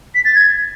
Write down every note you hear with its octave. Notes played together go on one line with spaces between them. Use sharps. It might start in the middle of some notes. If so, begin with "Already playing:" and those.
B6
A6
G#6